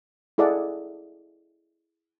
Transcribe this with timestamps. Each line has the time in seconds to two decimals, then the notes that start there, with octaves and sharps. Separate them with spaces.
0.38 E4 G#4 A4 D5 D#5 F#5